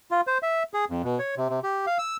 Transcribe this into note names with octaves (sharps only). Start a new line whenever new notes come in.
F4
C5
E5
G#4
F2
B2
C#5
C3
C3
G4
F5
E6